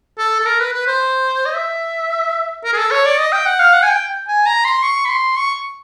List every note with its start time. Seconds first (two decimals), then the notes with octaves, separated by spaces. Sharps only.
0.18 A4
0.40 A4
0.45 A#4
0.60 B4
0.73 B4
0.87 C5
1.46 D#5
1.54 E5
2.64 A#4
2.73 G#4
2.78 A4
2.91 C#5
3.05 D5
3.19 D#5
3.32 G5
3.46 F#5
3.60 F5
3.73 F#5
3.83 G#5
3.91 G5
4.28 G#5
4.46 A#5
4.65 C6
4.83 C#6
5.05 B5
5.10 C6
5.37 C#6